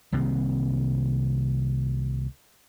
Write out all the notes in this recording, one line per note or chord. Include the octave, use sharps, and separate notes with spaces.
C2 C3 D#3 A#3